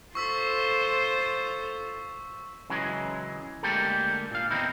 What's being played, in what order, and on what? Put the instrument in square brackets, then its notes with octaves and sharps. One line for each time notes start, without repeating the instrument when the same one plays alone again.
[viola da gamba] F4 A4 C5 [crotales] C#6 E6 B6
[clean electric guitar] C#3 E3 F#3 G#3
D2 G#3 A#3 G4 A4
A#2 F5
E2 C4 D#4 E4